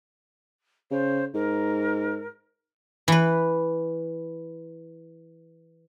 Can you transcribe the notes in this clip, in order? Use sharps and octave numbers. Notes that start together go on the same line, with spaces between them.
C#3 C5
G#2 A#4
E3 B4